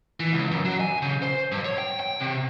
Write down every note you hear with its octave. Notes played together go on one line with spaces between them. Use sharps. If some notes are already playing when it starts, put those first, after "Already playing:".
E3
C#2
F#2
F#3
G#5
C#3
C5
G2
C#5
G5
G5
C3